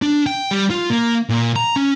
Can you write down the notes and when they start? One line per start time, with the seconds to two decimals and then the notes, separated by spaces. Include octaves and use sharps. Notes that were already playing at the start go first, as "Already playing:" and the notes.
0.02 D4
0.27 G5
0.51 G3
0.70 F4
0.90 A#3
1.29 A#2
1.56 A#5
1.76 C#4